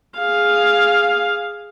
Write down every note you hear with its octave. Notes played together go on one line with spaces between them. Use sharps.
G#4 F5